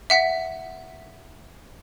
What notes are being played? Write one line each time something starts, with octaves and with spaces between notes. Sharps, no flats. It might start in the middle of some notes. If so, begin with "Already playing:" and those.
E5 F#5 B6